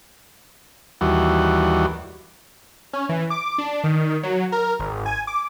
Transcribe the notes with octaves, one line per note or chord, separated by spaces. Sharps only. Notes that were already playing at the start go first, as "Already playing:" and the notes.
D#2 E3 G3 F#4
C#4
E3
D6
D4
D#3
F#3
A#4
G#1
G#5
D6